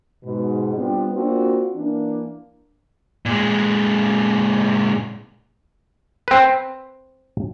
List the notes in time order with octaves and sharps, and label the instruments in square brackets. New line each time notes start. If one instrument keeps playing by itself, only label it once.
[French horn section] G#2 B2
G3 B3 C4 D4 F4
A#3 C4 D4 F4 F#4
E3 A#3 D4
[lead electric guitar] A#2 G#3
[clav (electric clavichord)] C4 B4